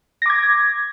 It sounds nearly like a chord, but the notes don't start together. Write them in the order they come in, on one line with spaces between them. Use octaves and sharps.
A#6 D6 G#6